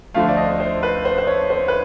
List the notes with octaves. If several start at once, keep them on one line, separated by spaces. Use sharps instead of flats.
D2 D3 F3 A3 F5
D5
D#5
C5
B4
C5
C5
C#5
C5
B4